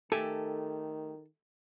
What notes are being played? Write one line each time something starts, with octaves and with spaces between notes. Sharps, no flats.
D#3 A3 G4 A4 G#5